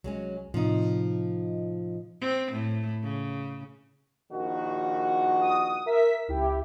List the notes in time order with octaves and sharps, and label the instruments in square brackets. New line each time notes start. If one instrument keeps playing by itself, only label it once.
[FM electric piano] C2 [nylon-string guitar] F#3 G#3 C#4
[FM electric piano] A2 C3 D#5 [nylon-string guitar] F3 D#4
[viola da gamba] C4
A2
C#3
[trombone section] A#1 D#3 F#4
[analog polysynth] D#6
A#4 E5 B6
C#2 E4 G4